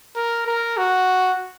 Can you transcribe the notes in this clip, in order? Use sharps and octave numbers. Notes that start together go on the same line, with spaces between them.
A#4
A#4
F#4